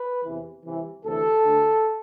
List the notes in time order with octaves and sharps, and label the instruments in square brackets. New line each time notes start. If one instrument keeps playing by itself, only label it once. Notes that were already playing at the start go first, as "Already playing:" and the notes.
Already playing: [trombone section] B4
E2 C3 E3
C2 C3 E3
D2 C3 E3 A4
D2 D3